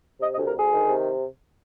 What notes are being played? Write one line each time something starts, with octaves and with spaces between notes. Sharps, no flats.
C3 D#5
D#5
D2
A#4
D2 G#4
D#3
C3